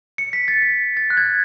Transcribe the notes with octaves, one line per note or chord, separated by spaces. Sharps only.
C#7
B6
A6
B6
A6
F#6
G#6